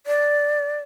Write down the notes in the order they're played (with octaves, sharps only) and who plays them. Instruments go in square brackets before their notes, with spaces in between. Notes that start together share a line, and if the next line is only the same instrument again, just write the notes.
[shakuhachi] D5